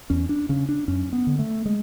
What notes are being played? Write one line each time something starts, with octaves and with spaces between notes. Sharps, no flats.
E2 C#4
D4
C#3 C#4
D4
F#2 C#4
B3
D3
A3
G#3